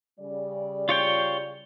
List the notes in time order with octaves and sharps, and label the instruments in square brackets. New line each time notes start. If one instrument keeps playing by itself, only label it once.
[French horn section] C#3 G3 D5
[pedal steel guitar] F4 C#5 G5